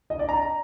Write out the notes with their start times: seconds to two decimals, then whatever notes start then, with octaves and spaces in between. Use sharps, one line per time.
0.10 D#5
0.19 D5
0.29 A#5